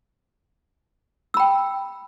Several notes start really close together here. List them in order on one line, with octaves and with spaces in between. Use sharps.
E6 B5 G5